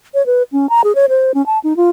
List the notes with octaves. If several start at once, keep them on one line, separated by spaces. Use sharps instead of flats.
C#5
B4
C#4
A#5
G#4
C#5
C5
C#4
A5
D#4
F4